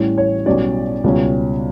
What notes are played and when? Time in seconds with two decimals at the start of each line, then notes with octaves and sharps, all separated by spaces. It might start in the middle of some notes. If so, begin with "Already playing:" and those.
Already playing: A1 A2 E3 G3 C#4
0.18 C#5
0.46 B1 B2 G3 C#4 D5
1.04 C#2 B2 G3 C#4